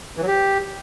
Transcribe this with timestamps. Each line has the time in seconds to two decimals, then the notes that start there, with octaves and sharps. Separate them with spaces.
0.17 E3
0.22 F#3
0.27 G4